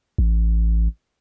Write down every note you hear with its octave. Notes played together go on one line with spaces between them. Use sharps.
A1